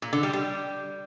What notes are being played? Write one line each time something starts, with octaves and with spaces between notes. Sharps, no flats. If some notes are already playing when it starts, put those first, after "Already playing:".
A#2
D3
G3
G3